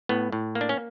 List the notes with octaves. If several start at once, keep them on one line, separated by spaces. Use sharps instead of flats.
A2 B3
A2
A#3
D4
C#4